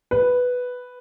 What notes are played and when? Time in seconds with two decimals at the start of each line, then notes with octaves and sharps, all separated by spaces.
0.11 B4